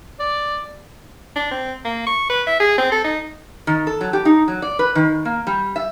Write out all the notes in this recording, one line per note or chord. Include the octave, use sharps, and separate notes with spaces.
D5
D4
C4
A#3
C#6
B4
E5
G#4
C4
A4
D#4
D#3
A4
F#3
G4
D#4
F#3
D5
B4
D#3
A#3
G3
E5